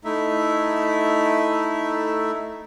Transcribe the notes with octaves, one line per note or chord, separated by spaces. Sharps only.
A3 D#4 E4 E5